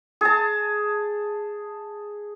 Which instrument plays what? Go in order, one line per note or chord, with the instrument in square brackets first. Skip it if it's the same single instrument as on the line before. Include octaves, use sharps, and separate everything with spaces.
[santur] G#4 A5